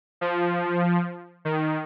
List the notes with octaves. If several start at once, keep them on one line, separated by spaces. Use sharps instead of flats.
F3
D#3